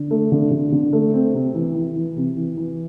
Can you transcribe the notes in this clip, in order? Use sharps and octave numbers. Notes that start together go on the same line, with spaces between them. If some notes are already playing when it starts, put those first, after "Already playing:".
Already playing: D3
A3
D3
D3
D3
A3
C4
C3
E3
E3
E3
C3
E3
E3